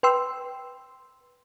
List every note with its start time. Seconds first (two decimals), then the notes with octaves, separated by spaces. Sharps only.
0.03 B4 G5 C6 E6